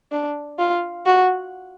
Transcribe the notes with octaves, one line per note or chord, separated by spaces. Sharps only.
D4
F4
F#4